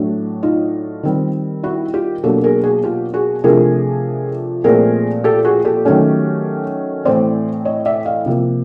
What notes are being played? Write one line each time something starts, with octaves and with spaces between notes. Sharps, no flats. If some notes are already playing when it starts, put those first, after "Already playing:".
Already playing: A2 F#3 A3 D4
D#4 F4
D#3 G3 C4
E4 F#4
F4 G4
B2 F#3 A#3 D4 G4 A4
G#4 A#4
F#4 G#4
F4 G4
F#4 G#4
C3 F3 A3 D4 G#4 A#4
A#2 F3 A3 C4 G#4 A#4
G4 A4
F#4 G#4
G4 A4
D#3 F#3 A3 C#4
A2 E3 A3 C4 C5 D5
C#5 D#5
D5 E5
D#5 F5
C3 F3 A#3